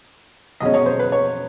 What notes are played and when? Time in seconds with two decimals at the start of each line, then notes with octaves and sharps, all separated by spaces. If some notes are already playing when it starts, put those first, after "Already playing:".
0.60 B2 G#3 C#4 D#5
0.74 C#5
0.86 C5
0.99 B4
1.12 C#5